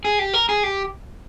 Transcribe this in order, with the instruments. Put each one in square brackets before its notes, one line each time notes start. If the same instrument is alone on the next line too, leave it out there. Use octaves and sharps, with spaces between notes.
[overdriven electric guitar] G#4
G4
A#4
G#4
G4